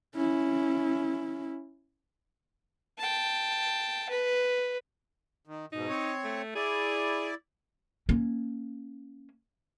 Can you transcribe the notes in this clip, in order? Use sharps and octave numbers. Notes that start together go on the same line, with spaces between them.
C#4 E4
G5 A5
B4
D#3
G#2 B2 D#4
C4 C#5
A3
E4 G#4 D5
A#3 C#4